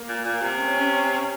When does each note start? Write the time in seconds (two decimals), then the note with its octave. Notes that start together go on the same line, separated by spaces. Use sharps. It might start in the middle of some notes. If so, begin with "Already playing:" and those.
Already playing: A#3
0.08 A#2
0.25 A#2
0.42 C3
0.60 C#4